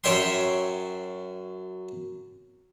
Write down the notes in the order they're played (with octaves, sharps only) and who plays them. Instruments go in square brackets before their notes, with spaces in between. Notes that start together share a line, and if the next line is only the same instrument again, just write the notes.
[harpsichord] F#2 C#5 E5 G5 C6